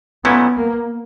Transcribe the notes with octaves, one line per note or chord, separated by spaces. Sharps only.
A#2 F#3 A3 B3 C#4 E4
A#3